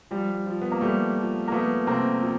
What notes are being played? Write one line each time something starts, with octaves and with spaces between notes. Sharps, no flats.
F3 G3
F3
B3
A#3
F3 G3 A3
F3
A#3
F3 A3 B3
C3 A#3 C4
F3